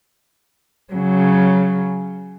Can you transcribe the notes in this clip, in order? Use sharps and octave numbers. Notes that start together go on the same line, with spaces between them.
C#3 F#3